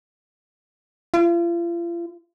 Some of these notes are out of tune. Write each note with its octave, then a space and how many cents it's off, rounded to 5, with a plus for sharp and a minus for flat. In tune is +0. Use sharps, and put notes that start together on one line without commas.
F4 -40